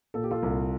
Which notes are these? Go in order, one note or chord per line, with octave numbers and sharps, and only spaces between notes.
A#2 A4
G4
F4 A4
C2